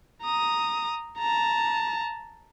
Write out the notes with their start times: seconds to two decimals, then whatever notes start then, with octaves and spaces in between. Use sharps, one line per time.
0.22 A#5 D#6
1.18 A5 A#5